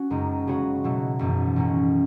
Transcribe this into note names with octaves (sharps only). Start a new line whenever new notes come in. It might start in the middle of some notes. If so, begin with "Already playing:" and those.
Already playing: C#4 F#4
F#1 F#2 C#3 G#3 D#4
C#3 G#3 B3 F#4 C#5
B2 F#3 A3 E4
G#1 F#2 E3 B3
B1 A2 F#3 C#4